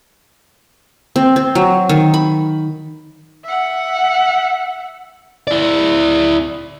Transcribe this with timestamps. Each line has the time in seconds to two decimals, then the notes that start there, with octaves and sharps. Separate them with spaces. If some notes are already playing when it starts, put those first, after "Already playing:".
1.16 C4
1.36 C4
1.55 F#3
1.89 D#3
2.14 B5
3.44 E5 F#5
5.47 E4 D5